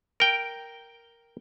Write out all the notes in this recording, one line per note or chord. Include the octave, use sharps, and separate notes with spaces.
A#4 G5